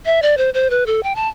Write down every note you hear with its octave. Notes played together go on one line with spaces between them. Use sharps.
E5
D5
C5
C5
B4
A4
G5
A5